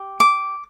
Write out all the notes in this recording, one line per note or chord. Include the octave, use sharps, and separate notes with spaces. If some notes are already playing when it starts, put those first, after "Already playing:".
Already playing: G4
D6